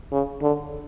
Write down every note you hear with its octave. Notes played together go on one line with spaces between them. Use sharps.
C#3
D3